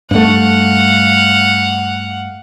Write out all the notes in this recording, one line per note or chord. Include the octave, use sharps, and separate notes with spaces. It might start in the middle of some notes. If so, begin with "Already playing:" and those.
G2 A3 F5 F#5